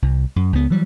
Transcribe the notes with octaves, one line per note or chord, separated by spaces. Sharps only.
C2
F#2
C#2 B3
E3 F#3 G3